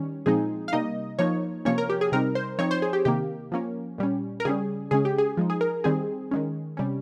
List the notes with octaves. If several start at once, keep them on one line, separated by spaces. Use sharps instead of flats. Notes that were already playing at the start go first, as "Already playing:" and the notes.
Already playing: D#3 G3 C#4
A#2 F3 G#3 C4 D#4 G#4
F5
C3 G3 A#3 D#4 D#5
F3 A#3 D#4 C#5
C3 F3 A#3 C#4 C#5
A#4
G4
G#4
C3 G3 C4 D#4 A#4
C5
F3 C4 D#4 C#5
C5
G#4
G4
C3 D#3 A#3 G4
F3 A#3 C#4
A#2 G3 C#4
A#4
C#3 G3 C#4 G#4
C#3 G#3 C#4 G#4
G4
G#4
F3 G#3 D#4
G#4
A#4
D#3 G3 C4 G#4
D#3 G#3 C#4
C3 G3 C#4